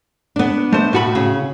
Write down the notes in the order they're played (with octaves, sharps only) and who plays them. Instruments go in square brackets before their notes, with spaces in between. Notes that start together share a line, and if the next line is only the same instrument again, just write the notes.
[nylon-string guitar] B3 D4
[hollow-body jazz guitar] A3 C5
A2 F#4 B5
[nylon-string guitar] C#3